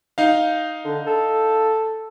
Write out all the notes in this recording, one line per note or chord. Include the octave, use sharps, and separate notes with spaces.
D#4 F5
D3
A4